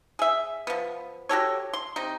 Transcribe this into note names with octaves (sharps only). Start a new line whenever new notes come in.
G#4 E5
F3 B3
F#4 G4 A4 C#5
C6
C3 D#4